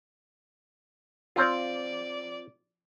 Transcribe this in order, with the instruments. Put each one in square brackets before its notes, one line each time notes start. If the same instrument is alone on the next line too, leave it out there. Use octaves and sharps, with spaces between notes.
[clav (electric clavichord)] C4 F4 [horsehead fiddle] D5